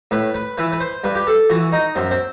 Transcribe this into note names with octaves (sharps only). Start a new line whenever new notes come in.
A2 B4
B4
E3 B4
B4
C5
G2 B4
G4
A4
E3 F#4
D#4
F#2 C4
C4